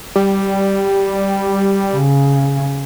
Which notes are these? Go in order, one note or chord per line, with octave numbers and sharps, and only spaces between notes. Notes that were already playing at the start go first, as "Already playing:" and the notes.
G3
C#3